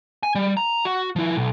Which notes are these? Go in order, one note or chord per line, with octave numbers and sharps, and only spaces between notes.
G#5
G3
A#5
F#4
F3 E4
B1